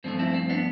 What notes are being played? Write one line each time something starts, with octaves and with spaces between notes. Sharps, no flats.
G2 F3 A3 C4
C4 E4
C4
B3 D4